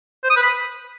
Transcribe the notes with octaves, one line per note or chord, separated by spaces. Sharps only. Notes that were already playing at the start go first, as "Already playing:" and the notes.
C5
D#6
B4
B5